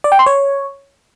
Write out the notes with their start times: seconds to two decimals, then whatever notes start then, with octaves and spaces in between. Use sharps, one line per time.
0.04 D5
0.12 G5
0.19 C6
0.26 C#5